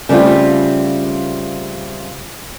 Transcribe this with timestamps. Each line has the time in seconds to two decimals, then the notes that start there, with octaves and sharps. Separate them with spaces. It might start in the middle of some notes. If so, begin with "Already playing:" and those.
0.09 C#3 G3 A3 C4 F4